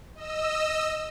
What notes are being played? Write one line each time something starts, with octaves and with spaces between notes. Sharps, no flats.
D#5 E6